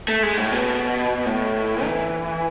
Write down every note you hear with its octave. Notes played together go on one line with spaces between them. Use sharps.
A3
G#3
A2
B2
A2
E3